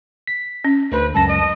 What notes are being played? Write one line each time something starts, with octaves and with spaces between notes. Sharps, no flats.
B6
C#4
D2 D3 B4 C5
C#2 F#2 A5 A#6
D#5